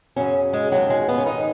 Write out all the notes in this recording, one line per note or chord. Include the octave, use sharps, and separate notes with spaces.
F#2 C#3 C#4
G#3
D#2 C#3 F#3
G#3
B3
C#4
G#2 D#3 D#4